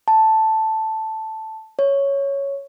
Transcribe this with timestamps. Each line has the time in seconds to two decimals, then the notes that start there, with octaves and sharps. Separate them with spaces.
0.08 A5
1.79 C#5